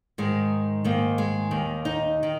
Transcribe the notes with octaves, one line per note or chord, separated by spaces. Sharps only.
G#2 D#3 G#3
G#2 D#3 A#3
G#3
D#2 D#3
D#4
D#3